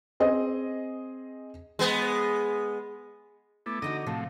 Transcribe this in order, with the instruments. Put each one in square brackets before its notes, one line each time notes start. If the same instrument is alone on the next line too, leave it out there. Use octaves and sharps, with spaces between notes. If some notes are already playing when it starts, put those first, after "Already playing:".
[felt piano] C4 G#4 D#5
[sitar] G#3 B3
[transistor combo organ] A3 B3 E4 [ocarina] D6
[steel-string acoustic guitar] D3 D#4 F#4 [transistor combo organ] A#5 D#6
[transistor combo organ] A2 C3 [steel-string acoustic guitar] F3 [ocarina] A5